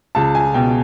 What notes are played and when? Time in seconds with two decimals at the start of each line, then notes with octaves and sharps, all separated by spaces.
0.15 C#2 A5
0.35 G#5
0.54 B2 G5